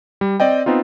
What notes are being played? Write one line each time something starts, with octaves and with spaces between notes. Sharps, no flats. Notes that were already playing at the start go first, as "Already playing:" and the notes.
G3
C4 D5 D#5 G5
B3 C4 D#4 F4